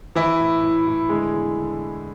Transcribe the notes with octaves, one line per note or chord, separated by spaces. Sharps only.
E3 E4
A2
A2
A2
D3 G#3 G#4
E2
D3